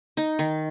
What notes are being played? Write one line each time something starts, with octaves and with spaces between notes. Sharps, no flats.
D#4
D#3